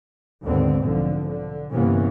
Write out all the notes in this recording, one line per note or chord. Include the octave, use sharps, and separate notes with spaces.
D#2 G#2 D3 B3 C4
B1 D3 F3
D3
G1 C3 E3 A#3 B3 C#4